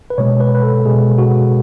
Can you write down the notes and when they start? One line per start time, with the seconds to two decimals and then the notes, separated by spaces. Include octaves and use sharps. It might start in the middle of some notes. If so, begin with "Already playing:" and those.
0.10 B4
0.18 B2 G#3 C#5
0.40 B4
0.55 B4
0.63 A4
0.85 B2 G#3 G#4
1.18 F#4